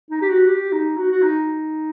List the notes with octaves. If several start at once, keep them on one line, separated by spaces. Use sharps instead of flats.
D#4
G4
F#4
G4
D#4
F#4
F#4
D#4